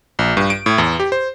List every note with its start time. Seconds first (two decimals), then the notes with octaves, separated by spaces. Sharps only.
0.19 A#1
0.37 G2
0.50 D7
0.66 A2
0.78 E2
1.00 G4
1.12 C5